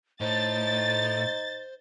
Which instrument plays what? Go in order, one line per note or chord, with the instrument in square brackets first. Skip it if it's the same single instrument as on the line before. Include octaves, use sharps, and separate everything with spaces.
[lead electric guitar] A2 [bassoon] D#4 [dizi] C5 [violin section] A6